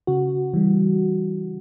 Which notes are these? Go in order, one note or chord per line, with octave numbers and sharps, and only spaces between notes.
C#3 F#4
E3 G3